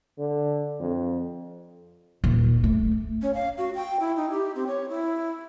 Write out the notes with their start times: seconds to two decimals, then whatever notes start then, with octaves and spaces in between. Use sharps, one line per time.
0.19 D3
0.80 F2
2.24 D#1
2.64 A3
3.22 C#4
3.34 F5
3.58 F#4
3.75 G5
4.00 E4
4.17 D#4
4.30 G4
4.55 C4
4.67 C#5
4.89 E4